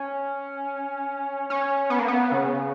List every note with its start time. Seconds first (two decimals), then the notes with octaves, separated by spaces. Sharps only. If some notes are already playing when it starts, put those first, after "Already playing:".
Already playing: C#4
1.50 C#4
1.90 B3
1.99 A#3
2.08 B3
2.32 C#3